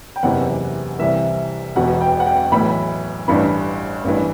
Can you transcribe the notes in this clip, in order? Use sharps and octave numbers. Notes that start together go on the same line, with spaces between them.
G5
F#1 E2 C3 E3 F#5
C2 C3 E3 E5
E1 E2 B2 F#5
G5
F#5
G5
B1 A2 E3 B5
A1 G2 E3 B5
A1 G2 E3